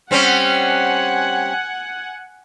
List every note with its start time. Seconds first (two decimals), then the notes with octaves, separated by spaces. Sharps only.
0.11 G3 C4 C#4 F#5 G#5